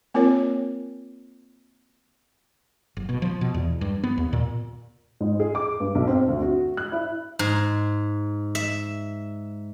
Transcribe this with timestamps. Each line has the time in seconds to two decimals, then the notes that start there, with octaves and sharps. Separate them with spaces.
0.14 A#3 C4 F4 A#4 C#5
2.97 F#1
3.09 B2
3.22 F3
3.41 B2
3.54 E2
3.81 G2
4.03 B3
4.18 D#2
4.33 A#2
5.20 G#2
5.40 G#4
5.55 D6
5.80 G2
5.95 B1
6.07 C4
6.28 D2
6.42 F#4
6.77 F#6
6.92 E4
7.39 G#2
8.55 E5